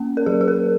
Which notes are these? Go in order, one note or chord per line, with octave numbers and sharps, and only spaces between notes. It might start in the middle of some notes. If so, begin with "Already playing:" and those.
Already playing: A#3 C#4
A#4
F#3 G#4
G#4
A#4